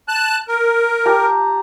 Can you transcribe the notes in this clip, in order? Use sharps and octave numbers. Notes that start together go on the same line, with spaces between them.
A5 F#6
A#4
G4 A5 A#5